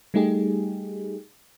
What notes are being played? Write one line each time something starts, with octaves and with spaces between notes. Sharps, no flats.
G3 A3 D#4 G4 G#4